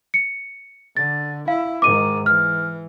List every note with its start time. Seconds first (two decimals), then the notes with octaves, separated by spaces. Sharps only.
0.14 C#7
0.97 D3 A6
1.48 E4 F5
1.82 G#2 D#3 D6 D#7
2.26 E3 F6